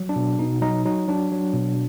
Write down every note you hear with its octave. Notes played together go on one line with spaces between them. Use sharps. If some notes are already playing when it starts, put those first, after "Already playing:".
Already playing: F#3
D4
B2
B2 D#4
F#3 D#4
F#3 D#4
F#3 D4
F#3
B2